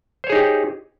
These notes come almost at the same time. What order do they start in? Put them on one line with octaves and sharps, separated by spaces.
C5 C#5 G#4 D#4 G4